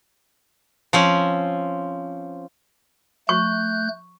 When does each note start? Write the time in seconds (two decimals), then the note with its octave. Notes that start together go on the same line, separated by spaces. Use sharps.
0.93 F3 C4 C#4
3.29 A3 C#6 F#6 G6